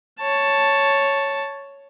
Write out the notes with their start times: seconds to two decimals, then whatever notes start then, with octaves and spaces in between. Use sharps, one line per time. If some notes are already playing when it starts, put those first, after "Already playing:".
0.20 C#5 A5